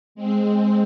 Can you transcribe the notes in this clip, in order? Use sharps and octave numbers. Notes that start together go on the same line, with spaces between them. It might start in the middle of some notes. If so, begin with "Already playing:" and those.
G#3 C4